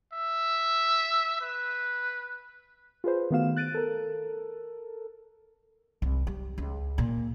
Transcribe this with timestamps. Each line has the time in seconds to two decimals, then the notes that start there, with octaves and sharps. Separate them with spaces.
0.13 E5
1.41 B4
3.04 F4 G#4 B4 C5
3.31 D#3 A3 B3 F#4 F5 E7
3.56 F#6 A6 D7 D#7
3.74 A4 A#4
6.02 C2
6.27 G3
6.58 C#2
6.98 A#2